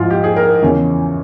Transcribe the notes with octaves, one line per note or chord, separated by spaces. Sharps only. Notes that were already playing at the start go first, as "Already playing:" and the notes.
Already playing: G#2 F3 G#3 E4 F4
G4
G#4
A#4
E2 C#3 E3